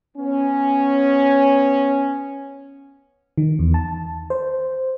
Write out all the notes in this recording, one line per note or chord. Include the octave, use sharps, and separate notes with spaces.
B3 C#4
D#3
E2
A5
C5